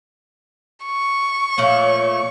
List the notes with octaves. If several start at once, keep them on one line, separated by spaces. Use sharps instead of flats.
C#6
A#2 F3 A3 C#5